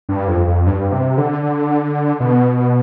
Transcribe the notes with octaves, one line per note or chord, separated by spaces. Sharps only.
G2
F2
F2
G2
C3
D3
D3
B2